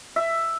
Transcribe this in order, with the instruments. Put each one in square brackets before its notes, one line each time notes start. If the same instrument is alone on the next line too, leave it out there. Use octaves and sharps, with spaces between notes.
[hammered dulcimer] E5